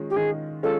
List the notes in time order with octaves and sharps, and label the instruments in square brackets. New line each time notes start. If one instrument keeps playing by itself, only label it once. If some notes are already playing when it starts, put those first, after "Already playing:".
Already playing: [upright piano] D#3 G#3 C#4 F4
[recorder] G4
[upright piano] D#3 [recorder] G#4
[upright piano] G#3 C#4 F4 [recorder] A4